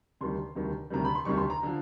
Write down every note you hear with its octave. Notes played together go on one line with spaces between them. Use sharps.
D2 C3 D#3 G3 C6
D2 C3 D#3 G3
D2 C3 D#3 G3 A#5
B5
C6
D2 C3 D#3 G3 C#6
C6
A#5
D3 F3